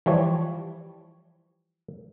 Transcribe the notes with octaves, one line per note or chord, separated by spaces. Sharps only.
E3 F3 G3 C#5